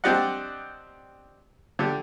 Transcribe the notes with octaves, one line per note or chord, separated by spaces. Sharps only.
C4 D4 G4 D5 D#5 F#5
D3 G4